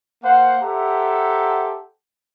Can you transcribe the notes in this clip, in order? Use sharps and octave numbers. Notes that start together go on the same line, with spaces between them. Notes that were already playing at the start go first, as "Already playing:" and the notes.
A#3 C5 F5 F#5
G4 A4 C5 E5 F#5 A#5